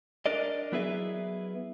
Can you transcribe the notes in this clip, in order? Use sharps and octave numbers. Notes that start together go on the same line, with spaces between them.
D4 A#4 D5 D#5
F#3 B3 E4 G#4 B4 E5